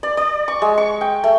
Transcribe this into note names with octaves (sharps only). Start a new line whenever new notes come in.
D5
D5
C#6
G#3
C#6
G5
A3